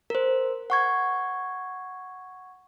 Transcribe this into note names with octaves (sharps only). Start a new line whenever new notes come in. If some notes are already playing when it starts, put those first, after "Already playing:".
A#4 C5
F#5 C#6 G#6